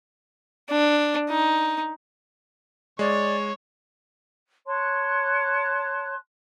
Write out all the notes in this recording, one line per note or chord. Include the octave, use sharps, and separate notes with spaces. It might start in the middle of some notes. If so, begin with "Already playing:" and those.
D4
D#4
G#3 C#5 D5
C#5 A5 C6 F#6